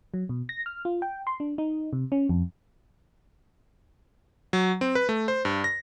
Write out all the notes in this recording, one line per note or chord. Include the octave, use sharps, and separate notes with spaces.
F#3
B2
A#6
F6
F4
G5
C6
D4
D#4
C3
C#4
F2
F#3
C4
B4
A3
C5
G2
A#6